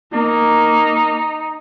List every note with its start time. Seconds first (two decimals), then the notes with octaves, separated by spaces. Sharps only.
0.13 A#3 D#4